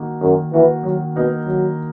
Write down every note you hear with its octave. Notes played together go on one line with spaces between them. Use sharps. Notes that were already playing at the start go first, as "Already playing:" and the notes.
Already playing: D#3 A#3 D#4 F#4
F#2 D#3
E3 A#3 D#4 F#4
D#3 F#3
B2 A#3 D#4 F#4
D#3 F#3